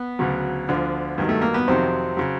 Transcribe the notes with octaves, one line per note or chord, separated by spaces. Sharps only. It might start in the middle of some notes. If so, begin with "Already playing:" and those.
Already playing: B3
D2 C#3 F#3
D2 D3 F3
G2 D#3 F#3
A3
A#3
B3
F2 C3 D#3 F#3 C4
C#3 F#3